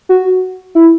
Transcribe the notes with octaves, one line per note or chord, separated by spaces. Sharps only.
F#4
E4